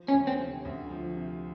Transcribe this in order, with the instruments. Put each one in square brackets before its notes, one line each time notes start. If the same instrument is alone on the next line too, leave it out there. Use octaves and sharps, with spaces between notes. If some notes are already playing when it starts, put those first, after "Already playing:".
Already playing: [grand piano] F3
[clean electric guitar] C#4
[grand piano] D2
[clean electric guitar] C4
[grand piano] C3
D2
F3
C3